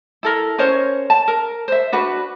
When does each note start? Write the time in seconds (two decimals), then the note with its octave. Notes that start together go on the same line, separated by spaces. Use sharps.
0.23 E4 A4 A#4
0.58 C#4 A#4 C5 C#5
1.10 A5
1.28 A#4
1.68 C5 E5
1.92 D4 F#4 B4